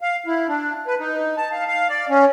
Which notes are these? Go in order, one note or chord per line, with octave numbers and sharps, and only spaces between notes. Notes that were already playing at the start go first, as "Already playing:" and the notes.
F5
E4
D4
B4
D#4
A5
F5
F5
D5
C#4